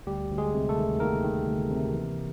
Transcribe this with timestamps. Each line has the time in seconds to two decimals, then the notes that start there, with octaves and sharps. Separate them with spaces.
0.07 D2 G3 G4
0.31 D2
0.38 G#3 G#4
0.54 C3
0.69 A3 A4
0.78 D#3
1.00 D#3 A#3 A#4
1.24 D#3
1.47 D2
1.70 C3
1.94 E3